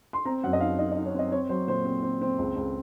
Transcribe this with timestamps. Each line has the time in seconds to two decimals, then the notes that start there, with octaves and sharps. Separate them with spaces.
0.13 C6
0.25 C4 A#5
0.44 F#2 F#5
0.53 D#5
0.61 D#4 F5
0.79 D#4 D#5
0.92 D#5
0.97 D#4
1.06 C#5
1.14 C4 D#5
1.32 C4 C#5
1.49 F#3 C5
1.68 A#2 C5
1.85 C4
2.03 C4
2.21 C4
2.39 C#2
2.56 C#2